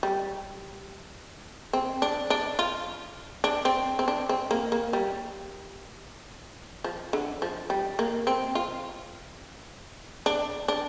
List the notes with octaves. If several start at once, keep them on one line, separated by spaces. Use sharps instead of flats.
G3
C4
D4
D4
F4
D4
C4
C4
D4
C4
A#3
A#3
G3
F3
D3
F3
G3
A#3
C4
F4
D4
D4